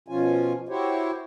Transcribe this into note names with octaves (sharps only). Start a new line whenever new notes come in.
B2 F3 C#4 F4 G#5
E4 F#4 G4 C5 C#5